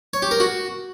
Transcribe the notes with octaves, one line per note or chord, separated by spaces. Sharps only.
C#5
G4
A#4
F#4